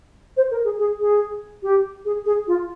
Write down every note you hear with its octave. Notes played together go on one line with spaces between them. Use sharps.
C5
A#4
G#4
G#4
G#4
G4
G#4
G#4
F4